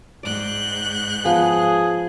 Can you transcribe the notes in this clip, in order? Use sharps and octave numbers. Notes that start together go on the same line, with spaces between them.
G#2 D5 G5 F#6 G6
F3 B3 G#4